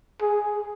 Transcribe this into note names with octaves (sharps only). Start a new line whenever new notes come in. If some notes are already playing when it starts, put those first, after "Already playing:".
G#4